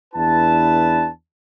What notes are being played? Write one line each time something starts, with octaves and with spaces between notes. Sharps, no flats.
E2 D4 E4 B4 A5